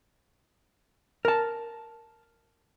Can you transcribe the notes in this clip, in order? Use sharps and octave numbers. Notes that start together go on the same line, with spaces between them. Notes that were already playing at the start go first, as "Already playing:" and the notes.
A#4 A5